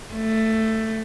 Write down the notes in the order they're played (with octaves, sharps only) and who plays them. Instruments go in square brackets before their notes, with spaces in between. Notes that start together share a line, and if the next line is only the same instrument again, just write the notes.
[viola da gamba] A3